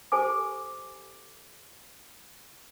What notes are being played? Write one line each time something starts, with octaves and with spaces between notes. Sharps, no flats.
G4 A4 C5 G#5 D6